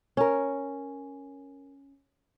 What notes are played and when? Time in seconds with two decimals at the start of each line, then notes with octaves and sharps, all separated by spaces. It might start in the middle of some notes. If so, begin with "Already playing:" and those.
0.17 C#4 A#4